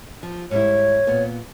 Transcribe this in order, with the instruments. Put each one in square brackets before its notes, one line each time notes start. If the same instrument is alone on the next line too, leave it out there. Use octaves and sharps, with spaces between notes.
[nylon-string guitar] F3
[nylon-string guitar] G#2 G3 E4 [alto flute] C#5
[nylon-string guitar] A#2 B3